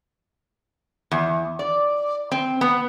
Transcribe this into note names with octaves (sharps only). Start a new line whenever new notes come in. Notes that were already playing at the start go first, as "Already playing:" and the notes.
E2
D5
C4
B3